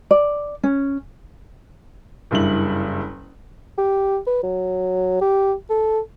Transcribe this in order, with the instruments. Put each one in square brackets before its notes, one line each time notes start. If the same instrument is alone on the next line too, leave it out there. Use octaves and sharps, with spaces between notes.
[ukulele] D5
C#4
[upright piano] F#1 G2 E4 F#7
[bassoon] G4
B4
F#3
G4
A4